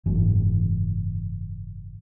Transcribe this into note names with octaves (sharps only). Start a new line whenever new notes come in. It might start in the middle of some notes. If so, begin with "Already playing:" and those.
F#1 G#2 E3